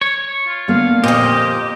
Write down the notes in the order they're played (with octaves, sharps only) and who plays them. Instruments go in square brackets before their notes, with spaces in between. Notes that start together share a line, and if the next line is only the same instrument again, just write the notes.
[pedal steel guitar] C#5
[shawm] F4
[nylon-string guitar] D3 A#3 B3 [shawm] F5
[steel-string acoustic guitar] F2 A#2 [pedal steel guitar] G4 [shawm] D#5